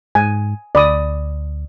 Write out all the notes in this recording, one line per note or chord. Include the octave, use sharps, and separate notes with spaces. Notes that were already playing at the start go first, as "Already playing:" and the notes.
G#2 G#5
D2 D5 B5 D#6